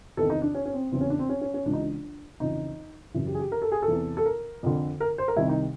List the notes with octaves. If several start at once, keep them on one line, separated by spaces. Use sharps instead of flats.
E2 C3 D#3 A4
D#4
D4
C#4
C#4
C4
E2 C#3 E3 C4
C#4
D4
C4
C#4
C#4
C#4
C#2 C#3 E3 D4
D#4
D4
F2 C#3 E3 D#4
F#2 C#3 E3 E4
G4
G#4
G4
A#4
A4
G#4
A4
E2 C3 E3
A4
A#4
F2 D3
A#4
C5
A#4
C2 C3 D#3 E4
D#4